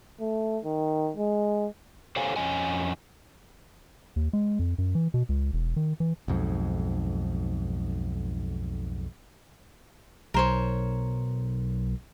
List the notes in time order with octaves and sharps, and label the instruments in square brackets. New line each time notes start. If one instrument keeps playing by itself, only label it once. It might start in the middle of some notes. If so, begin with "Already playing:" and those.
[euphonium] A3
D#3
G#3
[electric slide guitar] G4 A4 C5 C#5 F5 G#5
F2 C#4 D#5 G#5
[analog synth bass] D#2
G#3
F2
F#2
E3
B2
C#2
E1
D#3
E3
[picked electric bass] B1 F2 G#2
[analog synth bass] B1 [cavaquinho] A#4 C5 C#5